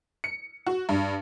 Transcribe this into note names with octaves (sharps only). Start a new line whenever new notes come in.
C#7
F#4
G2